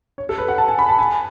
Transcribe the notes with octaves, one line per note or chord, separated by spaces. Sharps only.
C#5
A4
B4
F#5
A5
G#5
B5
A5
G#5